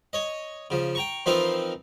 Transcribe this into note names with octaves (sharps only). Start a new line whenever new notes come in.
C#5 D#5
C#3 F3
G5 A#5 C#6
E3 F3 C4 D#4 F4 A#4